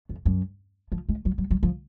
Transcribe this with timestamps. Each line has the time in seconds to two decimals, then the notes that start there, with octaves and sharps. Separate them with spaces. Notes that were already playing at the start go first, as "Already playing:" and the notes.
0.09 F2
0.26 F#2
0.92 F3
1.09 G#3
1.25 F#3
1.38 F#3
1.51 F#3
1.63 F3